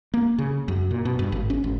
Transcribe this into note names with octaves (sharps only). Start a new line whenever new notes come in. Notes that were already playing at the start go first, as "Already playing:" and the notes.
A#3
C#3
F#2
A#2
B2
G2
G#1
C#4
G#1